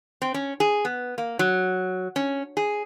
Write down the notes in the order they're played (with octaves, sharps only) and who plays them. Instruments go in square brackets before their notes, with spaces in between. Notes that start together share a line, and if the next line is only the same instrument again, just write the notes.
[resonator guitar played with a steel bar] C4
C#4
G#4
B3
A#3
F#3
C#4
G#4